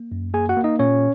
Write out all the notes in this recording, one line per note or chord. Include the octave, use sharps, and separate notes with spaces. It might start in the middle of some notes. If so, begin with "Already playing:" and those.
Already playing: A#3
F#2
A#3 G#4 G#5
F#4 F#5
A#3
D#4 D#5
A#2 C#4 C#5